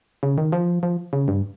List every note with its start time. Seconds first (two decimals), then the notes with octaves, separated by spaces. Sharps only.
0.23 C#3
0.38 D#3
0.52 F3
0.83 F3
1.13 C#3
1.28 G2